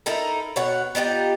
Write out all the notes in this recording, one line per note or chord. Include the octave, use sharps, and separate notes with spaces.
D#4 E4 A4 A#4
B2 C#5 F#5
B3 D#4 F4 G4